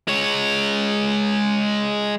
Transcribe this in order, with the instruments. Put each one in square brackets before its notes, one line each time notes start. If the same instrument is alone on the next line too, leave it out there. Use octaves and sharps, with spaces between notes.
[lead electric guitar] G#3 C#5